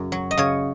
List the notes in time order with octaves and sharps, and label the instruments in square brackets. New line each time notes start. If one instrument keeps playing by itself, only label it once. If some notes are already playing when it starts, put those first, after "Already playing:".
Already playing: [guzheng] F#2 C#3
F#3
D#5
C#3 C#5